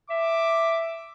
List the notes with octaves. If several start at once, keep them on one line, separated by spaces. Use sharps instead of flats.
E5 D6